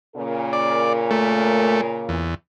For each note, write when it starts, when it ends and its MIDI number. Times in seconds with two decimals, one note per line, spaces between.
0.16 2.27 46
0.16 2.27 49
0.16 2.27 70
0.53 0.93 74
1.11 1.81 57
2.09 2.35 40